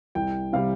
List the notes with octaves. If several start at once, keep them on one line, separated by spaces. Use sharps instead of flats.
C2 G5
C3 G3 F5